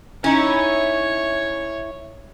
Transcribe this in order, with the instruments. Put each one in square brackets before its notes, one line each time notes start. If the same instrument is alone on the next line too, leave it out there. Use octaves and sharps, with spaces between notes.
[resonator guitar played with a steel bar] C#4 D#4 [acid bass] E4 [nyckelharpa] C#5